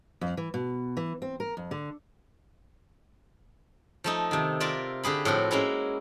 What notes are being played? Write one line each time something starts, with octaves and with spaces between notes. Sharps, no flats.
F2
E3
B2
E3
C4
A#4
F2
D3
F3 A3 D#4
C3 D#3
F4 A#4 D5 E5
D3 G4 G#4 B5
A2 F3 C4 F#4
G#3 A#3 C#4 E4